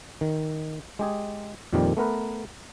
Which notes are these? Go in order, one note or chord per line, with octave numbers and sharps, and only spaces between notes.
D#3
G#3 G4 G#4
F2 A#2 D#3 F3 G3 G4
A3 B3 A#4 B4